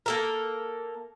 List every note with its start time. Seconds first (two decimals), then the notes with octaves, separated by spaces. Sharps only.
0.06 A#3 A4 A#4